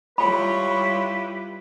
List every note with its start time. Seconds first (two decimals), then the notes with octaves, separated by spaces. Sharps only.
0.18 G3 E4 F4 G4 B4 C#5 B5